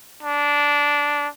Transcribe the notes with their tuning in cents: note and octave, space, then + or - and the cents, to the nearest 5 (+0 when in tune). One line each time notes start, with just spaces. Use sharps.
D4 -15